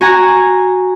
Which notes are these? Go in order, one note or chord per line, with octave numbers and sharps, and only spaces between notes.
F#4 G#5 A#5